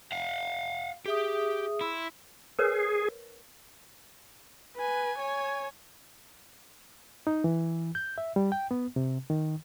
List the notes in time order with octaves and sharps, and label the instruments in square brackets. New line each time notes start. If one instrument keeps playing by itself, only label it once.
[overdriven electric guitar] F5 F#5
[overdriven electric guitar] G4 [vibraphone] G#4 E5 D#6
[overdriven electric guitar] E4 [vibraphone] B5 C6 E6
[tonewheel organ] G#4 [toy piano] A#4 B4 C#5
[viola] B4 G#5
C#5 G#5
[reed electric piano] D#4
E3
G6
E5
G3
G5
B3
C3
D#3